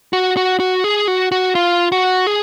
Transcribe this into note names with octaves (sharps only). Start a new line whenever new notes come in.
F#4
F#4
F#4
G#4
F#4
F#4
F4
F#4
G#4